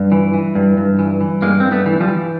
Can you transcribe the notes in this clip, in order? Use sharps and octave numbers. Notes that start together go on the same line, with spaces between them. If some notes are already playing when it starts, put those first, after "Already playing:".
Already playing: G2
E3
E3
G2
G2
E3
E3
G2 G#3 A#3
G2 C4
A3 B3
E3
F3 G3
E3